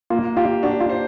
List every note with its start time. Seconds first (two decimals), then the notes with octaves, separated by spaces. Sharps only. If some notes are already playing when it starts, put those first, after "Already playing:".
0.10 A#3 F4
0.36 F4 G4
0.63 D4 F#4
0.80 F4
0.89 C5